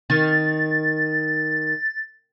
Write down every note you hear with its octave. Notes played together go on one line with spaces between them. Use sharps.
D#3 A6